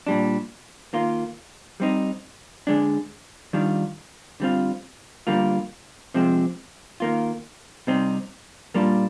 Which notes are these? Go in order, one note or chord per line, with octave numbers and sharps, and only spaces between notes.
A#2 G3 D4
D#3 A#3 F4
G3 C4 D#4
D3 G#3 D4
D#3 G3 D4 F4
D3 G3 C4 F4
D3 G3 A#3 F4
C3 F3 G#3 C4
D#3 A#3 F4
C3 G3 C4 D#4
A#2 G3 A#3 D4 F4